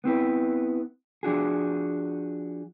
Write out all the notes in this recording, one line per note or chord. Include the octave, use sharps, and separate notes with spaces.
B3 C4 E4 B4
F3 D4 F#4 G#4